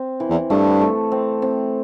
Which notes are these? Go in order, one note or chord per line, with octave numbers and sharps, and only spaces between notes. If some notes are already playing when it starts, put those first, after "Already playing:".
Already playing: C4
E3
E2
G2 A3
A3
C4
C4